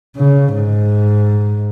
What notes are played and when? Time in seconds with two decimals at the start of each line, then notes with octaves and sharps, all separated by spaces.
0.17 C#3
0.55 G#2